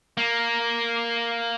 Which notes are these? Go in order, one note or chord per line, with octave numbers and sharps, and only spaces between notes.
A#3